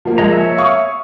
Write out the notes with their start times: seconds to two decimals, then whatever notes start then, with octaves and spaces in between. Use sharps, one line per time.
0.05 F3 A#3
0.18 G#3 D#5 A#5
0.32 C#5 E5
0.58 F5 C#6 D#6